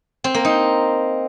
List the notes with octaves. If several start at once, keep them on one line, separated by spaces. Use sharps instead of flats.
C4
A#3
D#4